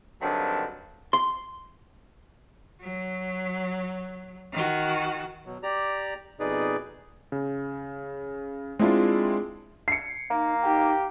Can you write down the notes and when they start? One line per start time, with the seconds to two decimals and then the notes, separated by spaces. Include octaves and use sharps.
0.22 G2 D3 D#3 F#3 C4 A5
1.13 C6
2.81 F#3
4.53 D#3 F#4
5.45 B2 F#3
5.63 G4 D5 A#5
6.40 F2 B2 D#4 G#4 B4 D5
7.32 C#3
8.79 G#3 C4 D4 E4 F4
9.88 C7 C#7
10.30 A#3 D#4
10.64 D#4 G4